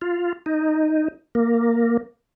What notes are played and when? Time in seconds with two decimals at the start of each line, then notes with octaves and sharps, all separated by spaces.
0.01 F4
0.46 D#4
1.35 A#3